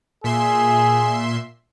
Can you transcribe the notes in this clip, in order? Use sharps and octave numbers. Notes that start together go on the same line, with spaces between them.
A#2 G#4 E5 C6